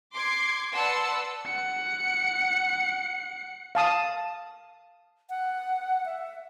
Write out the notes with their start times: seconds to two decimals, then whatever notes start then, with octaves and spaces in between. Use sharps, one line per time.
0.12 C6 D6 G#6 C7
0.73 B4 D5 F#5 A5 C6 E6
1.46 F#5 C#7
3.75 F5 A5 D#6
5.30 F#5
6.06 E5